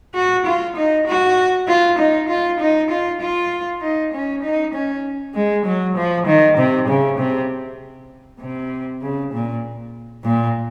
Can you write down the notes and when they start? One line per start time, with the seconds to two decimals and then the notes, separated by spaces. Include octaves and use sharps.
0.15 F#4
0.46 F4
0.76 D#4
1.07 F#4
1.68 F4
1.99 D#4
2.29 F4
2.60 D#4
2.90 F4
3.21 F4
3.81 D#4
4.13 C#4
4.43 D#4
4.74 C#4
5.35 G#3
5.65 F#3
5.96 F3
6.27 D#3
6.57 C3
6.88 C#3
7.18 C3
8.40 C3
9.02 C#3
9.33 A#2
10.24 A#2